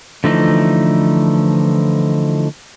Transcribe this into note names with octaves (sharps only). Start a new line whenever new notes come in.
D3 E3 F3 A3 D#4